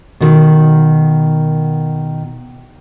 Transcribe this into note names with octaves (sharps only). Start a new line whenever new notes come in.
B2 D#3